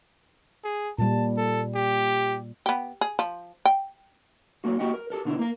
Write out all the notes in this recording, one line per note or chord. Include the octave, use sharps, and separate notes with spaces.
G#4
A#2 G3 A5
A4
G4
B3 G4
G#4
F3
G5
F#3 A3 A#3 F#4
A#3 F#4 G4 D#5 F#5
A#4
G4 A4 A#4
B2 D3 D#4 E4
A#3 A#4